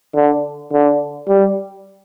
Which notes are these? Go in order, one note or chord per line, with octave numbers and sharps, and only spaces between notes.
D3
D3
G3